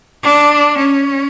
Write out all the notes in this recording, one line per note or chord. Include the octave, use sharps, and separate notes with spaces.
D4
C#4